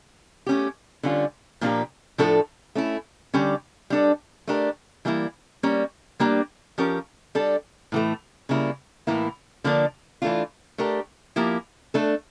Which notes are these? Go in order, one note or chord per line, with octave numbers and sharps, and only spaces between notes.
A3 C#4 G4
D3 G3 C#4 F4
A#2 F3 A#3 D4 G4
A2 F3 A3 D4 A4
A3 C#4 E4
D3 G3 C#4 G4
G3 D4 A4
A3 D4 G4 A#4
E3 G3 A#3 E4
G3 A#3 C#4
G3 A#3 D4 G4
F3 C#4 G4 A#4
G3 D4 A4
A2 E3 A3
C#3 G3 A#3 E4
A2 E3 A#3 E4
D3 F3 A#3 D4
E3 A3 D4 F4
A3 D4 G4 A#4
F3 A#3 E4 G4
A3 D4 A4